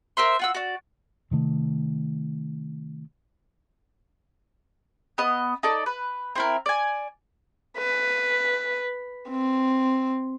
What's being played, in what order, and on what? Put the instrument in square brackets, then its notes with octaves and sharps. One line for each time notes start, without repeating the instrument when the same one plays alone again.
[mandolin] A#4 C5 E5 C6
F4 F#4 E6
F#4 D5
[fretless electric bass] C3 D#3 A3
[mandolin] B3 D#5
D#4 A4 D5
B4
C4 E4 A#4
D5 G#5
[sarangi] B4
C4